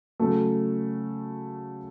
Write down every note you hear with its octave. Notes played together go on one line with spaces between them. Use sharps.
C#3 F#3 A3